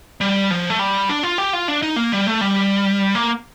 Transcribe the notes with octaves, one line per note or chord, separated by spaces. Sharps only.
G3
F3
A3
G3
D4
F4
G4
F4
D4
D#4
A#3
G3
A3
G3
A#3